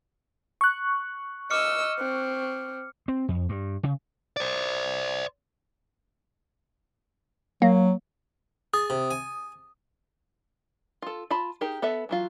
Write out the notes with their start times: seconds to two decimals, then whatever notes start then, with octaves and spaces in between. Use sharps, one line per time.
0.61 C#6 F#6
1.51 D#5 D6 E6 F6 C#7
1.99 C4
3.08 C4
3.28 F2
3.49 G2
3.83 C#3
4.37 C5 D5
7.62 F#3 A#3
8.74 G#4 D#6
8.90 C3
9.11 G#5
11.02 F4 A4
11.31 F4 A5 B5
11.61 D#4 G4 G#4 A#4
11.82 B3 A4 B4 E5
12.09 E3 F#3 F4